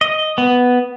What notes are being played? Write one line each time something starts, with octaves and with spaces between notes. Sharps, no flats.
D#5
B3